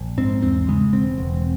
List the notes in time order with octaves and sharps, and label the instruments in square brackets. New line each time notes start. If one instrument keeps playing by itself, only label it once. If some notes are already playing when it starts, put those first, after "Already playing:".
Already playing: [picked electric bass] A#1
G#2 C4
E2 C4
C#3 G#3
E1 C4
E1